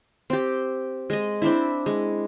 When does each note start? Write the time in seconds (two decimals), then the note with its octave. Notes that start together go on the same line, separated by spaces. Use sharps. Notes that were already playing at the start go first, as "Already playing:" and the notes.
0.30 C4 G4
1.10 G#3 D#5
1.42 C4 D4 E4
1.86 G#3